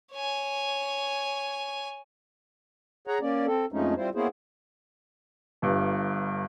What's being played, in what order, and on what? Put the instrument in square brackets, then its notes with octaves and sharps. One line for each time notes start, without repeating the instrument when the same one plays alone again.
[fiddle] C#5 G#5
[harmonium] G#4 C#5 F#5 A#5
A#3 C#4 D5
C4 A4
F2 F3 G#3 A3 C#4 D#4
G3 C4 E4 F4 C5
A#3 B3 C#4 E4 G#4 C5
[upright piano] G1 G2